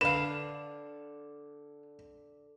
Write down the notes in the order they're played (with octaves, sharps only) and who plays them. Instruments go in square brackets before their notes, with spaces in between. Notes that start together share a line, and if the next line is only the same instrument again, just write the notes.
[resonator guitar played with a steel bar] D3 D4 [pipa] B4 F5 [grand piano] E7